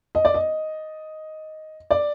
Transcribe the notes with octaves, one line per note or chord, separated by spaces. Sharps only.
D#5
D5
D#5
D5